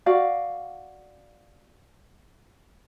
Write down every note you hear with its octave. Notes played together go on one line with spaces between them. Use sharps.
F#4 D5 F5